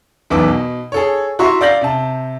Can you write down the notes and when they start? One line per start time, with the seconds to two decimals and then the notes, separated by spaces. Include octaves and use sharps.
0.30 D#1 B1 E2 B3 D6
0.48 B2
0.92 G#4 A4 C#5
1.39 E4 F#4 E5 A#5 C6 C#6
1.61 D5 F5 G6 A#6 F#7
1.81 C3 A5